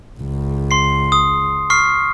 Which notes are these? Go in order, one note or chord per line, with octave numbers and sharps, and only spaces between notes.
C#2
C6 C7
D#6
C#6 F6 C7